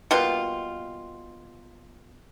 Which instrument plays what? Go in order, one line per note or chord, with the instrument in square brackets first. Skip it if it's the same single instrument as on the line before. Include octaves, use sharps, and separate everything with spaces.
[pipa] B2 G3 A#3 F4